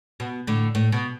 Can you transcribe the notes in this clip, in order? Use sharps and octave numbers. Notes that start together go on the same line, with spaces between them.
B2
A2 D3
A2
B2